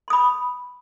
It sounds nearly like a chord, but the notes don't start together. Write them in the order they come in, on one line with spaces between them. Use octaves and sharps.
C6 D#6 B5